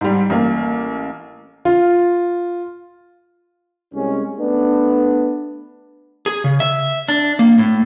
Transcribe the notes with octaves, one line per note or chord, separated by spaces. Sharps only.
G#2 G3
A1 A#3
F4
C2 G#3 C#4
A3 B3 D4
G#4
C#3
E5
D4
A#3
A2